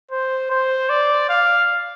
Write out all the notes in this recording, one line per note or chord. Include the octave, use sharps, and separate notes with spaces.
C5
C5
D5
F5